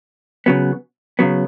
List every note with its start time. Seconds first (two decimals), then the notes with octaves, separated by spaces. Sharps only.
0.46 C#3 F#3 B3
1.19 C#3 F#3 B3